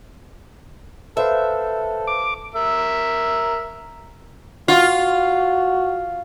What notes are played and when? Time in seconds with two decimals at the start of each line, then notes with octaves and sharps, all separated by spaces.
1.17 A4 B4 C5 E5 F5
2.07 D6
2.54 A#4 E5
4.68 F4 F#4